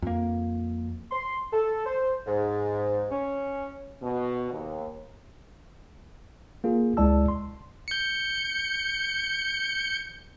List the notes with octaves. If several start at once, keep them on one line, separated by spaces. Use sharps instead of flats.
F2 A#3
C6
A4
C5
G#2
C#4
B2
D#2
A#3 F4 G#4
C#2 G#3 E4 D5 A5 E6
C6
G6 C#7